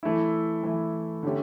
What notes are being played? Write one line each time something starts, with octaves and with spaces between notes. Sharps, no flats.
E3 A3 E4
E3 A3 E4
D3 A3 C#4 G4